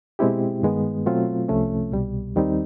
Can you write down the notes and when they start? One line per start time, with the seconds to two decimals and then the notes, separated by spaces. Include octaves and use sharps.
0.19 B2 G#3 C4 E4 G4
0.62 G2 D#3 G#3 B3
1.06 B2 F#3 A3 C4 F4
1.48 C2 C3 F3 A3 C#4
1.92 C2 B2 G3
2.36 D#2 D#3 G3 C4 D#4